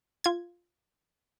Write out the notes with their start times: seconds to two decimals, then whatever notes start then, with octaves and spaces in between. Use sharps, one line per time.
0.24 F4 G#6